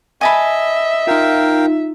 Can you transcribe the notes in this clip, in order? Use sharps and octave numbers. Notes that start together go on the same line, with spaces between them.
D#5 E5 G#5 A5 B5
D#4 F4 A#4 F5 G5